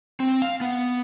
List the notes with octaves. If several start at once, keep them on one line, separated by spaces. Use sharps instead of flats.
C4
F5
B3